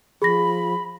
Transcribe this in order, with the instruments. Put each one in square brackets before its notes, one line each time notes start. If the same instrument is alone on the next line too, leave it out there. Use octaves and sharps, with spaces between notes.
[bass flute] F3 [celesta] G#4 A#6 [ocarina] B5